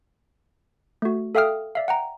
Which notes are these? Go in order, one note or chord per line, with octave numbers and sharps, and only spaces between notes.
A3 F#4
A4 E5 F5 G5 D#6 F6
D5 E5 F5
F#5 G5 A#5